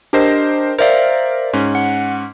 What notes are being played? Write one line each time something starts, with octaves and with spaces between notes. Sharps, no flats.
D4 G4 A#4 C5 D#5
A#4 C5 D5 E5 F5
G#2 C#4
F#5